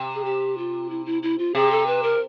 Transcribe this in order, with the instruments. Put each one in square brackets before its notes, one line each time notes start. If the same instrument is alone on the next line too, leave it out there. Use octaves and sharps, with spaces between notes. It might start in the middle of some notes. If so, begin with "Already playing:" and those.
Already playing: [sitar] C3
[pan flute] G#4
G4
F4
E4
E4
E4
F4
[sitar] C3 [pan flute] G#4
[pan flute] A4
B4
A#4